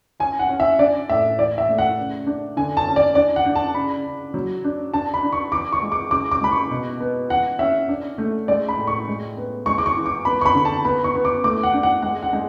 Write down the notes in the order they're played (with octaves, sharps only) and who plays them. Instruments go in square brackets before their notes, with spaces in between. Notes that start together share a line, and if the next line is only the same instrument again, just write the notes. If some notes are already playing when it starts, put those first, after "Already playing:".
[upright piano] C#4 G#5
F#5
C#4
E5
D4 D5
A2 E5
E3 D5
E5
A3
F#5
C#3
D4
D3 G#5
A5
C#4
D5
D4 D5
F#5
D4
A5
C#3 B5
C#3
F#3
D4
D4 A5
B5
D4
C#6
E3 D6
C#6
G#3
D6
C#3 D6
D6
G#3 B5
C#6
B2
B3
E3 F#5
C#4 E5
D4
A3
G#3 D5
B5
A2
C#6
G#3
B3
G#3 C#6
D6
C#6
E3
D6
B3 B5
C#6
B5
D3
A5
B3 B5
C#6
B3
D6
A3 D6
F#5
D4
F#5
G#3 F#5
F#5
G#3